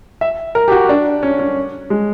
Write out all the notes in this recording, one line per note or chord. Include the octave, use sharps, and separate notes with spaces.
E5
A#4
G4
F#4
D4
C#4
C#4
G#3